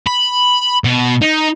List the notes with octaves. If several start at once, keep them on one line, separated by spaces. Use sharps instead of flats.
B5
B2
D#4